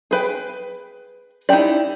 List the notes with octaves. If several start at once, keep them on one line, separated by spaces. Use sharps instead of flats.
G#4 B4 G5
D#4 E4 F#4 G4 D5